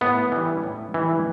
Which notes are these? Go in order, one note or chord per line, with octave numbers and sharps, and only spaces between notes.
A2 B3
E3 G3
A2
E3 G3